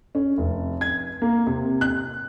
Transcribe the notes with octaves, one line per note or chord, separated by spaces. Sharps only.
C#4
F1
G#6
A#3
C3
F#6